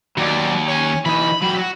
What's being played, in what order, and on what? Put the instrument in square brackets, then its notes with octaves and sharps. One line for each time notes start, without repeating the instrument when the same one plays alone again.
[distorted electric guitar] D#2 [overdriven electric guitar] F#3 D5
[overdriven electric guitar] C#5 G#5
[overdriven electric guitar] E3 D#4 [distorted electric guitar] B5
[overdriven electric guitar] F#3 G4
F#4